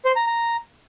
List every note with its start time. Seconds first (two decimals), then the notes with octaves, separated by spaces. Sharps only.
0.05 C5
0.16 A#5
0.27 A#5